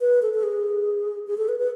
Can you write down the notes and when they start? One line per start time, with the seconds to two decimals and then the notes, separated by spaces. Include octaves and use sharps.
0.01 B4
0.22 A4
0.34 A4
0.43 G#4
1.27 G#4
1.37 A4
1.48 B4
1.59 B4